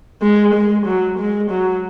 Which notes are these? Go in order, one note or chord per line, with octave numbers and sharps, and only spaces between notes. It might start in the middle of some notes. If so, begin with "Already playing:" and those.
G#3
G#3
F#3
G#3
F#3